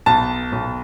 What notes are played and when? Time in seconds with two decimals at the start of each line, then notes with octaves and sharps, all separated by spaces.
0.06 B1 A5
0.52 B1